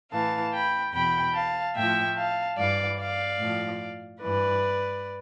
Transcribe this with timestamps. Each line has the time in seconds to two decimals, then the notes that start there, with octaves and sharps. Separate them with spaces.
0.12 A2 E3 F5 A5
0.53 G5 B5
0.94 E2 B2 G5 B5
1.34 F5 A5
1.75 A2 F3 E5 G5
2.16 F5 A5
2.57 G2 E3 D5 F5
2.99 D5 F5
3.39 A2 F3
4.21 G2 E3 B4 D5